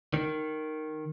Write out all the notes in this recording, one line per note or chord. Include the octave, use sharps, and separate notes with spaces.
D#3